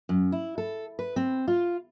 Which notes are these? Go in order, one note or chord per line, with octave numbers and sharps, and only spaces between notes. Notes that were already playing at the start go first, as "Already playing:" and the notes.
F#2
E4
A4
B4
C4
F4